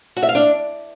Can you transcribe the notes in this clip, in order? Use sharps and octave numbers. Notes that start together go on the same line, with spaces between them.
F#4
E5
F5
D4